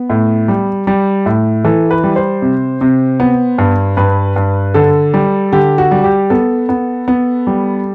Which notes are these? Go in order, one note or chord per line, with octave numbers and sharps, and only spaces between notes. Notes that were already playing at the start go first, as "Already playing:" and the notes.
Already playing: B3
A2
G3
G3
A2
E3 A4
B4
G3
C5
C3
C3
B3
G2
G2 B4
G2
D3 A4
G3
D3 G4
F#4
G3
G4
B3 A4
B3
B3
G3